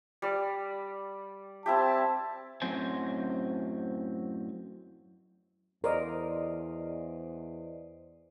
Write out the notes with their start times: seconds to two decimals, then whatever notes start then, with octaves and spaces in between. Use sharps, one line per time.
0.22 G3 D5
1.66 C4 E4 G4 A5
2.62 F#2 A2 F#3 C4 C5 G#5
5.84 E2 A#4 C5 D5 D#5